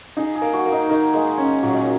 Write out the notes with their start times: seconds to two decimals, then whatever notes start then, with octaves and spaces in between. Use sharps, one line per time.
0.17 D#4 G#4
0.35 G#4
0.42 A#3
0.53 F#4
0.65 A#3
0.72 D#4
0.89 D#3 A#3
1.14 G#3 A#3
1.38 C#4
1.63 A#2 F#3
1.72 G#3
1.82 F#3